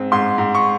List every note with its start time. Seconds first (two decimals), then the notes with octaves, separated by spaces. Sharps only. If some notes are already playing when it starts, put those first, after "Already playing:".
Already playing: G#2 C4
0.12 G#2 C6
0.38 G#2
0.55 C#6